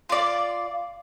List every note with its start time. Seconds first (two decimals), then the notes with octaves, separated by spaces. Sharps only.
0.09 F4 D5